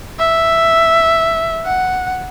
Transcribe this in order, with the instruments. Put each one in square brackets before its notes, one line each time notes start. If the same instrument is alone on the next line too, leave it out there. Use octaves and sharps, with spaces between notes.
[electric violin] E5
F#5